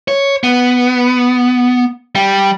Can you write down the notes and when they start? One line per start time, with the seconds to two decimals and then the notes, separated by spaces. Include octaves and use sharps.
0.08 C#5
0.43 B3
2.15 G3